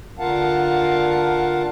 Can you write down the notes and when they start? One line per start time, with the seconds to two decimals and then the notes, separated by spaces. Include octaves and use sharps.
0.19 D3 F4 A#4 F5 F#5 A5